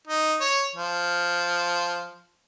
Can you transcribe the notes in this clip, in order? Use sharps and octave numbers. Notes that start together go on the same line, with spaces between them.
D#4
C#5
F3